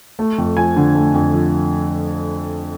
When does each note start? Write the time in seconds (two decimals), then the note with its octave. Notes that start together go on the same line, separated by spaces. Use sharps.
0.19 A3
0.38 F2
0.57 F3 G#5
0.76 D3
0.95 A3
1.14 F2
1.34 F3